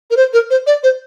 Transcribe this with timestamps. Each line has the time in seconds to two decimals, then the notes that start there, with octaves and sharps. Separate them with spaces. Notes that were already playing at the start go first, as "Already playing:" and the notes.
0.11 A#4
0.17 C5
0.33 A#4
0.50 C5
0.67 D5
0.83 C5